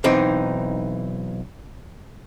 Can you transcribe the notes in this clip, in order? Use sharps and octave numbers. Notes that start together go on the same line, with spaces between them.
B1 E3 C4 D#4